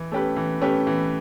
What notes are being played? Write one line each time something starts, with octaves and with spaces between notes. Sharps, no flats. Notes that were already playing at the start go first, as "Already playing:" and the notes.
Already playing: E3
A3 C#4 G4 B4
E3
A3 C#4 G4 B4
E3